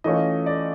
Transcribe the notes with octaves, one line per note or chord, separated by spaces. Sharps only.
E3 A3 C#4 F4 D#5
D5